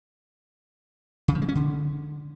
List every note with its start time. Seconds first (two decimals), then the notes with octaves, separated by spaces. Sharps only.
1.28 C#3
1.35 F3
1.42 G#3
1.49 C#4
1.55 D3